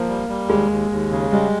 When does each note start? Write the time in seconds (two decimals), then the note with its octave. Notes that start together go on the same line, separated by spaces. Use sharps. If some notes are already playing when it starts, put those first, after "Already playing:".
Already playing: F3 A#3
0.09 G3
0.28 G3
0.50 D#2 G#3
0.71 D#2
0.91 D#2
1.12 C#3
1.32 G3 G#3